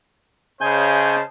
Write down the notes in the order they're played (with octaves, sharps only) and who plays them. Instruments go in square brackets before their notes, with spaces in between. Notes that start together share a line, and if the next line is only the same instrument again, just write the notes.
[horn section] C#3 [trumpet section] C5 D#5 A5 [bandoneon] G#5 G6